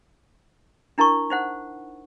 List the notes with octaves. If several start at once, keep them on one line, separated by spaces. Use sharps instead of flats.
D4 E4 A#4 A5 C#6
D#4 C5 F#5